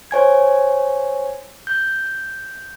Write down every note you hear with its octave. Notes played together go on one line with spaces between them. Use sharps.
C5 C#5 G#5 G#6
G6